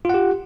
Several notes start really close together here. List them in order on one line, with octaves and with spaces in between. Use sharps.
F4 F#5 G4